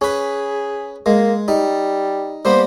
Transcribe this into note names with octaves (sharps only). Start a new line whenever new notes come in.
C#4 G#4 B4
G#3 A#3
G3 D#4
G3 A#3 B3 C5